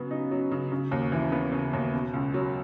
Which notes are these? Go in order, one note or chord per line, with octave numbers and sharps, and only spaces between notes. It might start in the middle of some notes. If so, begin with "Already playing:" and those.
Already playing: C#3 F#3 B3
D#4
F#3
C#3
C#3
D#2
E3
B3
C#3
D#2
B2
C#2
F#3